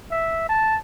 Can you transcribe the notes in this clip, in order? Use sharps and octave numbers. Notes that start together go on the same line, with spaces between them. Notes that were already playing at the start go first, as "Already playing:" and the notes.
E5
A5